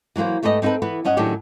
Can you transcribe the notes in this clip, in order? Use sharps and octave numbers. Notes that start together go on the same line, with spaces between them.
E3 F#3 G#3 A#3 C5
G#2 A3 G4 B4 D#5
C4 D#4 F4 A4 B4
E3 B3 B4
G2 C#4 D#5 F#5
A2 D#3 F#3 C#4 D4 G4